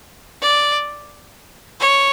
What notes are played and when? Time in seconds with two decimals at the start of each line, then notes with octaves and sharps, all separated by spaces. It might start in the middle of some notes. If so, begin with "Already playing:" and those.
0.42 D5
1.80 C#5